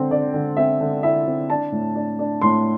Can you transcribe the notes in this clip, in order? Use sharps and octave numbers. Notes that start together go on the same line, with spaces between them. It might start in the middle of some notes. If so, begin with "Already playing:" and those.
Already playing: D3 C4
D3 D5
D3
C4 E5
D3
E4 E5
C4
D4 A5
A2
D4
D4
A2 C6